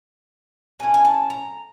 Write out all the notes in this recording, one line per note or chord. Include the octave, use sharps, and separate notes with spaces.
F#3 A3 C#4 E4 G#5
G#5
A5
A#5